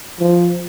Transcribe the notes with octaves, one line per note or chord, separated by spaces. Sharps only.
F3